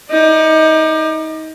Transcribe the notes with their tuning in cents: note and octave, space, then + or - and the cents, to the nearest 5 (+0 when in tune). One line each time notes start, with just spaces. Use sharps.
D#4 +25 D5 +40